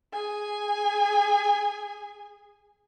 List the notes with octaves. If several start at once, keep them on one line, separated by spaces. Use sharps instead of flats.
G#4 G#5